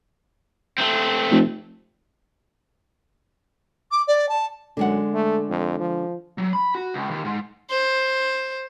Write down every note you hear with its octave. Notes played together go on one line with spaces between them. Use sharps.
A3 C4
F1
D6
D5
A5
F#2 D3 G#3 F#5
A3
F2
F3
F#3
B5
F#4
C#2
D#2
G#2
C5